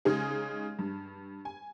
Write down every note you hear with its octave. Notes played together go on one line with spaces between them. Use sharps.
C#3 G#3 D#4 G#4
G2
G#5